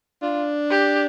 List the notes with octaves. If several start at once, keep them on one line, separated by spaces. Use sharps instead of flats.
D4 F4
G4